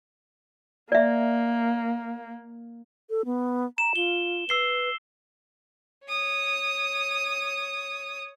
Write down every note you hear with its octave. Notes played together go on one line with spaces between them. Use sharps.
A#3 D5 E5
A4
B3
A#5 E7
F4 G7
B4 E6 C7 G7
C#5 D#6